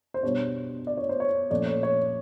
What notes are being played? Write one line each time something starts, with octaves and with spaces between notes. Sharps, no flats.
C5
B2 G3 B3 D4 C#5
D5
C#5
C5
C#5
A#2 F3 A3 C#4 D5
C#5
C#5